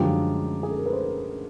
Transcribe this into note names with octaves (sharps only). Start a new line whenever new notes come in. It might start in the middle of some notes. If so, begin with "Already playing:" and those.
Already playing: F#2 D3 F3 G#3 F4 G4
G#4
A4
A#4
B4
A#4 C5